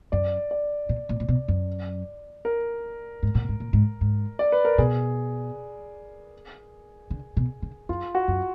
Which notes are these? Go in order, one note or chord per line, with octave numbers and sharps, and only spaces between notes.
F#2 D5
D5
A#2
A#2
A#2
B2
F#2
A#4
G#2
A#2
G#2
A#2
G#2
G#2
D5
B4
A#4
B2 G#4
D3
B2
D3
F#2 F4
F#4
F#2